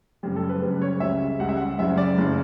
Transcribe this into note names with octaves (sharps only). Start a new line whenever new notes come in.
F#2 C#3 G3 G4
A4
B4
F#2 C#3 G3 B4
C#5
C#2 C#3 G3 E5
C#2 C#3 G3 F#5
E5
F#5
F#1 F#2 C#3 E5
D5
F#1 C#3